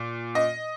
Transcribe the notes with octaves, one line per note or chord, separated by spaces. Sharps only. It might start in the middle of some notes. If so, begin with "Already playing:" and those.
Already playing: A#2
D#5